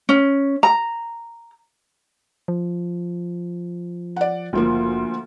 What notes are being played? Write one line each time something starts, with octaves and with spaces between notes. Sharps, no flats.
C#4
A#5
F3
D5 F#5
F#1 D2 F3 A#3